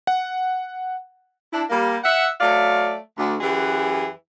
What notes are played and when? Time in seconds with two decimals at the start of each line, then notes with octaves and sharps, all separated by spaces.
0.07 F#5
1.53 D4 E4
1.70 G3 A#3
2.04 E5 F#5
2.40 F#3 A3 D5 F5
3.18 D2
3.41 F#2 E3 G4 G#4